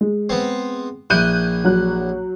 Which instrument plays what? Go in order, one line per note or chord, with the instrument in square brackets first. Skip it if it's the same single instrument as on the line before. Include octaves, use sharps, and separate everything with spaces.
[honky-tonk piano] G#3
[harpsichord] B3 C4
[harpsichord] A#1 E4 [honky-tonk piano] F#6 G6 D#7
[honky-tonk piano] F#3 F#6